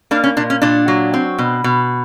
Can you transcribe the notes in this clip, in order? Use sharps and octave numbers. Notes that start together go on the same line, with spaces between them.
A#3 D4
C#4
A#2 D4
C#4
A#2 D4
F#3
C4
B2
B2